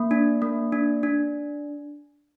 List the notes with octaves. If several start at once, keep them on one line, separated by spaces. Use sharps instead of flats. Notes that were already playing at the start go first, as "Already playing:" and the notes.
Already playing: A#3
D4
A#3
D4
D4